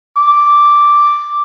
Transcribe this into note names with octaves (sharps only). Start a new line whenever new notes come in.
D6